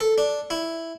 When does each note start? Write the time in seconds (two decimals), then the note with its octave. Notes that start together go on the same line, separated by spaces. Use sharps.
0.01 A4
0.18 D4
0.50 E4